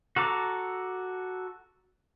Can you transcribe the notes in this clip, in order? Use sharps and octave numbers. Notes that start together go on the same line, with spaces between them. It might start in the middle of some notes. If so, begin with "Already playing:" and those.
F#4 A4 A#5 D6